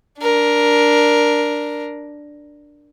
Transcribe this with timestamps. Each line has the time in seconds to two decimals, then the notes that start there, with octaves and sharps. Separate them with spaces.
0.20 D4 A#4